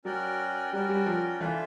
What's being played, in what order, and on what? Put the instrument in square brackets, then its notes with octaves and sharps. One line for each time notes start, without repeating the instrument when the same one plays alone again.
[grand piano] F#3 [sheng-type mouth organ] C#4 F#4 A#4 D5 G5
[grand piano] G3 [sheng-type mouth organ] C#4 F#4 A#4 D5 G5
[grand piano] G3
F3
[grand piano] E3 [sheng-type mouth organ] D4 F4 A4 C5 E5